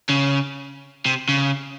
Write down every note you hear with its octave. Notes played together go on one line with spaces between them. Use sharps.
C#3
C3
C#3